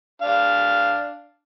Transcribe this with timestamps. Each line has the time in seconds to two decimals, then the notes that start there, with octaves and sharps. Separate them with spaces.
0.22 D4 F5